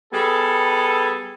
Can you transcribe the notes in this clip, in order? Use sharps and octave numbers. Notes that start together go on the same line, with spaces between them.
G3 B3 G#4 A4